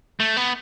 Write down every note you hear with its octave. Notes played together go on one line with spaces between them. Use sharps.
A3
B3